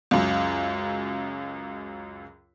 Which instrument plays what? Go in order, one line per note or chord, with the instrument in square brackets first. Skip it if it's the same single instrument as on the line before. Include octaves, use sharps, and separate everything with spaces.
[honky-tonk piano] C#2 F#2